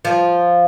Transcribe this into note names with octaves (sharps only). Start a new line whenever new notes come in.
F3